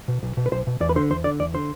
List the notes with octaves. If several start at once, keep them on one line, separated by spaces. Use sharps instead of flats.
B2
B1
B2
B4
B1 C5
B2
E2 D5
B4
D3 C5
E2 C5
D3 D5
E2 D5
D3 C5